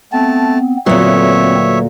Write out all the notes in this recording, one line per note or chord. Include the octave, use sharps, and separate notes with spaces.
A3 B3 C4 A5
D2 A#2 F#3 B3 C4 A4 C#5 E5